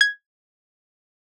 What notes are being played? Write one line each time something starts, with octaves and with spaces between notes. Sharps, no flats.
G#6